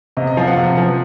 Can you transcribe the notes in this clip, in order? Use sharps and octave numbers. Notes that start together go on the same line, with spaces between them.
C3 D#5
D#5
F3 F5
F#5
C3
F3